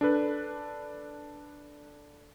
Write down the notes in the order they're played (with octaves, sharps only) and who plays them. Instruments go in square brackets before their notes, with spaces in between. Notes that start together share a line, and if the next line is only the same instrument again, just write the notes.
[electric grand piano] D4 A4 B4